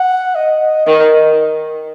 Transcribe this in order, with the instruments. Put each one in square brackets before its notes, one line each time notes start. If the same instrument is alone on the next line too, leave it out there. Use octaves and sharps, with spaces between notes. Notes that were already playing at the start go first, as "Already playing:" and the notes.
Already playing: [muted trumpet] F#5
D#5
[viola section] D#3 [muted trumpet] D#5